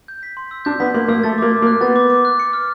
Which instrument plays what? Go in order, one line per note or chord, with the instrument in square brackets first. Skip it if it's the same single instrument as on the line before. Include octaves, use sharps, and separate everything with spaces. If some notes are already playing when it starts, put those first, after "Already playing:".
[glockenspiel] G6
B6
C6
E6
[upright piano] D4 [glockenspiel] G6
[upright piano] B3 [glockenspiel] B6
[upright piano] A#3 [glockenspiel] C6
[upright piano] A#3 [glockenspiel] E6
[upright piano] A3 [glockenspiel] A6
[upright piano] A#3 [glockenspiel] D6
[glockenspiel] D6
[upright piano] A#3
[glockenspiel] F#6
[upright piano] B3 [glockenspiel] A6
[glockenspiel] D6
D6
F#6
C#7
F6